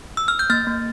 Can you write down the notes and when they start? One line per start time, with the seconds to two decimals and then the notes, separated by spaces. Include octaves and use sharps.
0.17 E6
0.28 F6
0.39 G6
0.50 A#3 F6 A6
0.67 A#3